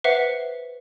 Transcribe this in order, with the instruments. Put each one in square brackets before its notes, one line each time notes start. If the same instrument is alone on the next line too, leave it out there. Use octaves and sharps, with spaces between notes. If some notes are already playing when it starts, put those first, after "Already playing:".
[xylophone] B4 C5 E5 F#5 C7